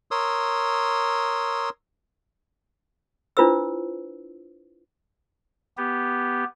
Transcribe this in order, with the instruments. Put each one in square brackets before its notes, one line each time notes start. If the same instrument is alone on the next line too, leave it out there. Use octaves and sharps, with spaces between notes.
[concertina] A#4 C#5 C6 D#6 E6
[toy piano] D4 E4 F4 B4 C5 E6
[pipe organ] B3 G4